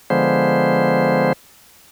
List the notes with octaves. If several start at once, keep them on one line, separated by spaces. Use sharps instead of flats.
D3 F3 G#3 B3 C5